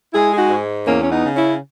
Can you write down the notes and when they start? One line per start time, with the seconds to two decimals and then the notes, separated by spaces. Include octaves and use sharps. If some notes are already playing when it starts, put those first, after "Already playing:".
0.13 G#3 E4 G#4
0.32 G#4
0.37 D#4 F#4
0.50 G#2
0.86 E2 A#3 C#4
1.03 C#4
1.11 B3 D#4
1.23 C#3
1.35 C#4 E4